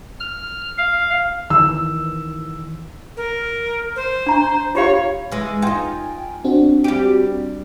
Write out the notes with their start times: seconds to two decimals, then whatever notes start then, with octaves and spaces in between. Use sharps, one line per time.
0.20 F6
0.78 F5
1.50 D#3 E3 E6
3.17 A#4
3.96 C5
4.26 D4 A#5
4.75 F4 G4 C#5 F5
5.32 E3 G#3
5.62 D#4 F4 G5 G#5
6.44 C4 D4 F#4
6.84 G3 G4